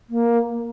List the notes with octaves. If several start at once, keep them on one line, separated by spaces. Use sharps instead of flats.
A#3